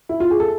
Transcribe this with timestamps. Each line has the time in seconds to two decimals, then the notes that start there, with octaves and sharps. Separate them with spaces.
0.09 E4
0.20 F4
0.30 G#4
0.40 A4